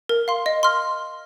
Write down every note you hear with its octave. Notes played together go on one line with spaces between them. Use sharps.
A#4
F5 C6
D#5
C6 F6